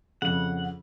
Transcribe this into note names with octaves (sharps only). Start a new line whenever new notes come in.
F2 C#3 F#5